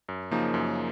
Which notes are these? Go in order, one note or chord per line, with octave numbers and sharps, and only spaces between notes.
F#2
C#3 F3 A#3 D#4
F#2